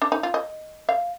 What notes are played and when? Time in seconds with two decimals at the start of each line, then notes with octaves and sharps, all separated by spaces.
0.02 D4
0.12 D#4
0.23 F4
0.34 D#5
0.89 F5